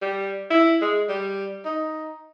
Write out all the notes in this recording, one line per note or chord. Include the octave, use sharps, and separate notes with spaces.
G3
E4
G#3
G3
D#4